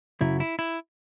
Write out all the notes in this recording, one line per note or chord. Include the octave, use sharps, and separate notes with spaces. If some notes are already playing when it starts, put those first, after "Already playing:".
F#2 C#3 F#3 E4
E4
E4